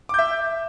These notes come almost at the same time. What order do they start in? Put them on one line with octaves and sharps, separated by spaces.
D6 G6 E5